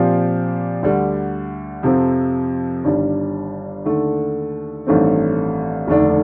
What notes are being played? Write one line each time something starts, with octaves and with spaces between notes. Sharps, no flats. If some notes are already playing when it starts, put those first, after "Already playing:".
Already playing: A#2 F3 C4 G4
D2 D3 G3
F2 C3 F3 C4
G1 G2 D#3 G3 D4
D#2 D3 A3
A1 G2 D#3 A3 C4
F1 D#2 D3 A3 D4